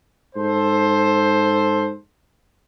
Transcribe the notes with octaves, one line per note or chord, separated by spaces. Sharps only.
G#2 A4 C5